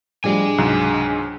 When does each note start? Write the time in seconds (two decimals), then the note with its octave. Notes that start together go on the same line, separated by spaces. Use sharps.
0.24 A2 F3 G3 D4 G#4 D#5 G#5
0.58 C#2 G#2 C3 F#3